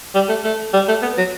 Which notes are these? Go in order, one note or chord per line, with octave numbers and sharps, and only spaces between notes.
G3
A3
A3
G3
A3
B3
F#3